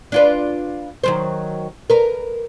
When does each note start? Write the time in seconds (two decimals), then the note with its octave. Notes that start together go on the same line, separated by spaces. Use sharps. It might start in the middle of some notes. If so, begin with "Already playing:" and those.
0.12 D4 F4 B4
1.04 D#3 F#3 C5
1.90 A#4 B4